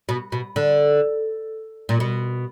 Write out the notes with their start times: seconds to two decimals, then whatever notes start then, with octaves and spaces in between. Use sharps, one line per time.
0.09 B2
0.32 B2
0.56 D3
1.89 A#2
2.00 B2